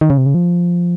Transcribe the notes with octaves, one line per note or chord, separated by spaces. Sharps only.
D#3
C#3
C3
C#3
F3